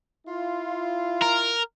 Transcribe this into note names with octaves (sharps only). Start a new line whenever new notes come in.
E4 F4
A#4